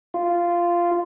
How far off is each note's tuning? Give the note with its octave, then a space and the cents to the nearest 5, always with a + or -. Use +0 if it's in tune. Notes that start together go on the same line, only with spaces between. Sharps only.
F4 -10